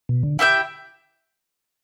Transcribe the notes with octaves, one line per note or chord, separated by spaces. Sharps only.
B2
D3
E4 G4 E5 G5